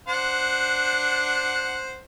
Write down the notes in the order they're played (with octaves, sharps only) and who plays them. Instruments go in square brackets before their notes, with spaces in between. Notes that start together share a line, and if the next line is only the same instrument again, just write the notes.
[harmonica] D4 C5 F#5